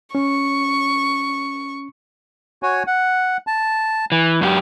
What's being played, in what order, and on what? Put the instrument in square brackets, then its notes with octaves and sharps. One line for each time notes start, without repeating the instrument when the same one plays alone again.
[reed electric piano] C#4 [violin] C#6
[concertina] F#4 C#5 G#5
F#5
A5
[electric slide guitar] E3
[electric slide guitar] F#2 F4 G4 [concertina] F5